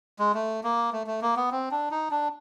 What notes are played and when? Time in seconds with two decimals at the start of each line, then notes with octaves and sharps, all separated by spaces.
0.19 G#3
0.34 A3
0.64 A#3
0.93 A3
1.07 A3
1.22 A#3
1.36 B3
1.51 C4
1.71 D4
1.91 D#4
2.11 D4